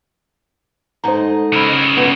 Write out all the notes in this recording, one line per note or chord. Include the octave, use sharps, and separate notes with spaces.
G#2 A3 C5 D#5 A#5
C#3 A#4 B5 E6 G#6
G2 B3 F4